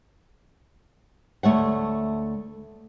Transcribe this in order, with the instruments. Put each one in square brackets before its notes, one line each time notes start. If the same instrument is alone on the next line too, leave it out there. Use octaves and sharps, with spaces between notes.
[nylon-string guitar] D2 A3 C#5 F#5